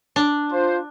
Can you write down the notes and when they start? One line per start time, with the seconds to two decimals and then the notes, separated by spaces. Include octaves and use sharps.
0.16 D4
0.52 F4 C5